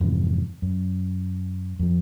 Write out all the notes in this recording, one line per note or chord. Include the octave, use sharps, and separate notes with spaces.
F2 G#2 C3 E3
F#2
F2 F3